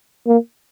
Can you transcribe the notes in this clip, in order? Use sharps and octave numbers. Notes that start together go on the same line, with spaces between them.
A#3